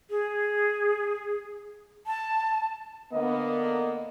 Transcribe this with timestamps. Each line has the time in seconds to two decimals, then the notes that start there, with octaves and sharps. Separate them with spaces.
0.10 G#4
2.06 A5
3.13 D3 A#3 B3 D#5